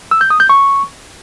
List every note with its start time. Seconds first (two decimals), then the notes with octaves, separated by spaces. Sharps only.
0.11 E6
0.21 G6
0.30 D#6
0.40 G6
0.49 C#6